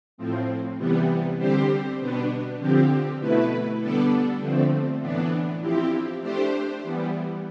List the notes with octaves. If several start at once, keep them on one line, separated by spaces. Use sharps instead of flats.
A2 F3 C4
C3 E3 G3 B3
D3 G3 C4 G4 C5
B2 B3 D4
D3 F3 C4 G4
B2 A3 E4 B4
D3 G3 B3 D4 A4
D3 F3 A3 C4
A2 E3 B3 D4
F3 C4 E4 G4
A3 D4 G4 C5
E3 G3 B3